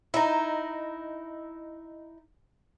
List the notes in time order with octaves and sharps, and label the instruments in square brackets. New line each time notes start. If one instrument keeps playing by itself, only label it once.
[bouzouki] D#4 E4